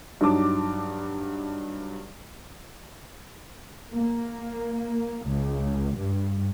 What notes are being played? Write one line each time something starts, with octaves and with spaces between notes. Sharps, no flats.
G2 F#3 D#4 A5 D6
A#3
C#2
G2